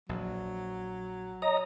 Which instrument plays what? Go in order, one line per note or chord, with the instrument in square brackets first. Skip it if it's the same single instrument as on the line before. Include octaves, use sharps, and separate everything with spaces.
[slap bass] A#1 [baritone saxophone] F#3
[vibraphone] C#5 [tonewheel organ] D#5 A#5